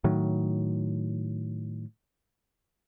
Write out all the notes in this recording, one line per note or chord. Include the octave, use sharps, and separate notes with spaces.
A2 D#3 F#3